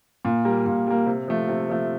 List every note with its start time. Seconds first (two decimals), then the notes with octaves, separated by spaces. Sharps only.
0.25 A#2
0.45 G3 A#3
0.66 A#2
0.87 G3 A#3
1.06 C3
1.28 F3 A3
1.49 C3
1.69 F3 A3